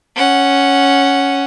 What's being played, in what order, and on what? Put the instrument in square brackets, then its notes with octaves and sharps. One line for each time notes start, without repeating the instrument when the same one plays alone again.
[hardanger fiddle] C#4 F#5